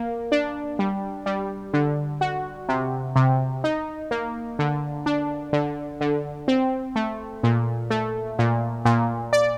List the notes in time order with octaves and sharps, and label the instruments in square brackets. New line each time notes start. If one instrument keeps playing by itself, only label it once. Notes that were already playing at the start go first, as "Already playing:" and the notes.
Already playing: [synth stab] A#3
D4
G3
G3
D3
F#4
C3
C3
D#4
A#3
D3
D4
D3
D3
C4
A3
A#2
A3
A#2
A#2
D5